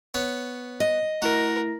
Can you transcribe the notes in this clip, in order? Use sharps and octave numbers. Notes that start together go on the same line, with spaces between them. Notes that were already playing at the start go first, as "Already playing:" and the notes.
B3 C#5
D#5
A3 E4 F#4 A#4 A#6